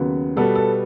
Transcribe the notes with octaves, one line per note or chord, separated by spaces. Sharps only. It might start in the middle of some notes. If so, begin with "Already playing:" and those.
Already playing: D#2 C#3 F#3 B3
B2 G3 B3 A4
A4